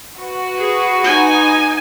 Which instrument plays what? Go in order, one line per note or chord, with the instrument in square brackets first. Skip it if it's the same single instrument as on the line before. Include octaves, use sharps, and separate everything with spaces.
[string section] F#4 B4
[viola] G#4
D#4 G#5